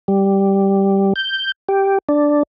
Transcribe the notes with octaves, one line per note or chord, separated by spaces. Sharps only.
G3
G6
G4
D4